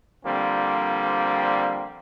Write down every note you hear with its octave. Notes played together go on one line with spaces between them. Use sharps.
D3 F3 G3 A#3 C4